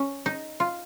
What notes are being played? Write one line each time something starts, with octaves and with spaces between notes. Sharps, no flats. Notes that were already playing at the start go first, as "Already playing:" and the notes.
Already playing: C#4
D#4
F4